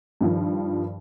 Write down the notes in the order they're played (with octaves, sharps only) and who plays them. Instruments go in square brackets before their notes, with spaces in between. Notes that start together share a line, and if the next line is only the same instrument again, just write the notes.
[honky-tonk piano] G2 D#3 F3